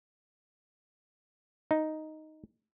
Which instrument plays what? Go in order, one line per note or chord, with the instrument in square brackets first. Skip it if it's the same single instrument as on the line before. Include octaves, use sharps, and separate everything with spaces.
[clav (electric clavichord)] D#4